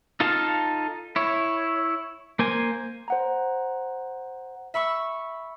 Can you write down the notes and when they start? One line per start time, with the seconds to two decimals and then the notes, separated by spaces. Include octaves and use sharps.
0.20 D#4 F4 A4 F5 A5
1.16 E4 C#5
2.39 A#3 C5 G#5
3.08 C5 F#5 A#5
4.74 E5 B5 C#6 E6